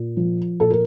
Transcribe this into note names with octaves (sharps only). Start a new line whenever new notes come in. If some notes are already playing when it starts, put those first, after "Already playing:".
Already playing: A#2
F3
A#2 A4
A#4